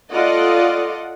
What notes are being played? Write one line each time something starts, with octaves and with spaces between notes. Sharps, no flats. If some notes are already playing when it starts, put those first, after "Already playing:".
F4 A4 D5 D#5 F#5